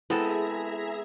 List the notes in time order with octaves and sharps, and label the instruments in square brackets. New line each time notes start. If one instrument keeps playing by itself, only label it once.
[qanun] G#3 A4 [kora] B3 C4 [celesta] E4 [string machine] G#4 E5 A#5